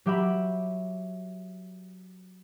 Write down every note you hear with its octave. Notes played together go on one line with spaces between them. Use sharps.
F#3 G4 E5 B5